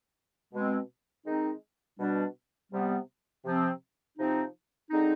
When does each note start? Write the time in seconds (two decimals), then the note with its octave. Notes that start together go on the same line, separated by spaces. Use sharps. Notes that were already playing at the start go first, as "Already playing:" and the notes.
0.53 B2 G#3 C4
1.26 D#3 G#3 C4 D#4
1.99 B2 G3 D4
2.72 C3 G3 B3
3.45 C3 F3 C4
4.18 C3 F3 C4 D#4
4.91 D3 G#3 C4 D#4